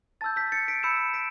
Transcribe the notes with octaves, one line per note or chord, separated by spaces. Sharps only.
A5 E6 G6 A6
G6 B6
A6 C#7
B6 D7
B5 E6 G6 C#7 E7
B6 D7